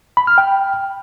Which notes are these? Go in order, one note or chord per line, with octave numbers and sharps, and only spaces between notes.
B5
F6
G5